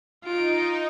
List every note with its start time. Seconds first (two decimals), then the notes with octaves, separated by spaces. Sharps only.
0.24 D#4 F4 D7